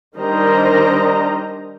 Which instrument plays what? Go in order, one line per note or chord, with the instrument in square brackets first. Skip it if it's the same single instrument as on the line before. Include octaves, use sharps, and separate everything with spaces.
[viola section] D#3 G3 D4 C5 D#5 A#5